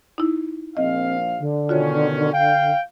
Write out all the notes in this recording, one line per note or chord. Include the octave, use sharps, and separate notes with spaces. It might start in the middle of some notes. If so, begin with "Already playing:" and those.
D#4 E4
A#1 C4 D#5 F5
D3
B2 D#3 C#4 F4 F#4 C#5
F5 G5